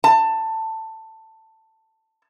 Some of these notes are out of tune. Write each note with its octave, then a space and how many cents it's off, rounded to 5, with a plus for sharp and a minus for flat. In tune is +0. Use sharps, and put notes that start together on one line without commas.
A5 +15